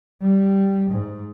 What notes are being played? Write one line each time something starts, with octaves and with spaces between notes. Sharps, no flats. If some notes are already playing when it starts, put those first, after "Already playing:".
G3
G#2